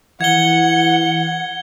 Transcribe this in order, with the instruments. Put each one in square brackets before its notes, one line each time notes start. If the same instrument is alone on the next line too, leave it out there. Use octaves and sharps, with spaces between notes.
[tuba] E3 [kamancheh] F#5 [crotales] G#6 G7